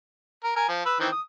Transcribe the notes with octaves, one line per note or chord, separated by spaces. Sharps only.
A#4
A#4 G#5
F3
B4 E6
D#3 E3 C4
D#6